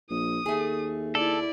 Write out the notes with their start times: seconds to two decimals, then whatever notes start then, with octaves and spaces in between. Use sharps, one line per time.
0.10 A#1 D#6
0.46 D#2 A3 G#4
1.15 E4 A4 D5